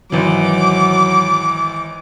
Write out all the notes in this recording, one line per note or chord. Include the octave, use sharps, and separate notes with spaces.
G#1 E3 F#3 D6